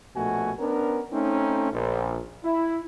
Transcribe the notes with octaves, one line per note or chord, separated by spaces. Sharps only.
A#1 B2 A3 F#4 G#5
B3 C#4 D4 A#4
A3 C4 C#4 D#4
A#1
E4